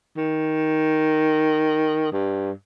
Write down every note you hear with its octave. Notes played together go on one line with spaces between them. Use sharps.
D#3
G2